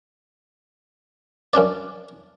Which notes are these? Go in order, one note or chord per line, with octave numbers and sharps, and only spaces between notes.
F#2 C#4 D4 D5